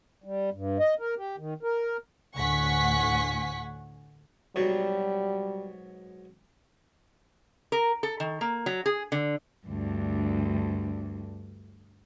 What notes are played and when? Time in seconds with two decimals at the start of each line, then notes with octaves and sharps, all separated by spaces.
0.24 G3
0.53 G2
0.79 D#5
0.99 A#4
1.17 G4
1.38 D#3
1.63 A#4
2.35 D2 A2 F#5 G#5 C#6 B6
4.56 G#2 B2 F#3 G3
7.72 A#4
8.03 A4
8.20 D#3
8.41 A#3
8.66 F#3
8.86 G#4
9.12 D3
9.67 D2 G2